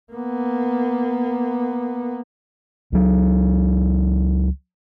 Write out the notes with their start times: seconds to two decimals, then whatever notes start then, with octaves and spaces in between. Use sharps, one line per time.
0.12 A#3 B3
2.92 C#2 F#3